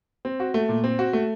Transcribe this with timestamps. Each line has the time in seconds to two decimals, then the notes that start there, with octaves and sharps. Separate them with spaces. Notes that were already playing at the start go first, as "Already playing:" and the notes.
0.25 C4
0.40 F#4
0.54 A3
0.69 A#2
0.84 C4
0.99 F#4
1.13 A3